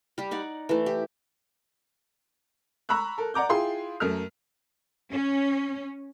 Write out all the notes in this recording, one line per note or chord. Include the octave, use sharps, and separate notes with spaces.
G3 G4
D#4 D5 F#5
E3 A3
G4
A#5 B5 C#6 E6 F#6
A4 A#4
D5 F#5 A#5 D6 G6
E4 F4 G#4 G5 C6
F#2 A3 A#4 F6
C#4